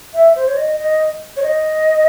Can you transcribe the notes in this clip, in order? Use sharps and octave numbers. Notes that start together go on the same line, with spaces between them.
E5
C5
C#5
D#5
D#5
C#5
D#5